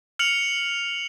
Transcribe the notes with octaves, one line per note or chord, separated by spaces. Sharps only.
F6 C#7 F7 F#7